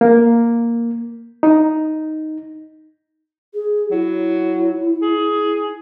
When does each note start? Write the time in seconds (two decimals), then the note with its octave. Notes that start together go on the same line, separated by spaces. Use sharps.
0.01 A#3
1.43 D#4
3.54 G#4
3.91 F#3 E4
5.02 G#4